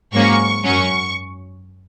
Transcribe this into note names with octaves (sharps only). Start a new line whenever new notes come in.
G#2 F#3 A#3 C#4 C#6
F#2 F#3 C#4 C#6